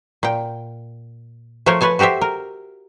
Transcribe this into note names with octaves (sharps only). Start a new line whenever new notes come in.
A#2 G5
F3 A3 A#4 C5 C#5
B4 C#5 G#5 A5
F#4 G4 A4 C5 E5
A#4